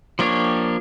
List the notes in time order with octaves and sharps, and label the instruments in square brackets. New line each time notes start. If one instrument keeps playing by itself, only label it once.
[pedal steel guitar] F3 A#3 D4 G4 C#5